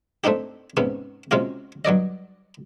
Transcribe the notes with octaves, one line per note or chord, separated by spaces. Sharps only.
A3 C4 D4 D#4 G4
G#2 C3 B3 C#4
C3 G#3 C#4 F4 F#4
G2 F#3 D5 D#5